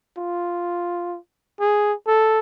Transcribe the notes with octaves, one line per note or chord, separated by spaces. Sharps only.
F4
G#4
A4